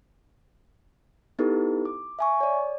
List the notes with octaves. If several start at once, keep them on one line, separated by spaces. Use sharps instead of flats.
B3 D#4 E4 G4 A4 B4
D6
E5 G#5 C#6
C#5 D5